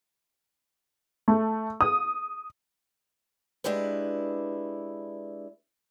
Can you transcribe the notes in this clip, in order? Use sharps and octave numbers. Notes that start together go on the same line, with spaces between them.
A3
D#6
G#3 D4 E4 G4 B4